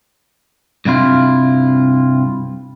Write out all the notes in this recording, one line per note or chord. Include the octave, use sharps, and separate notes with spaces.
G2 C3 E4 F4